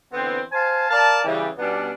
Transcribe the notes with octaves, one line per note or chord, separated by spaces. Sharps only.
D3 E3 B3 C4
C5 F5 G#5 A5
A#4 D5 F5 A5
C#3 E3 G3
B2 G3 B3 C#4 D4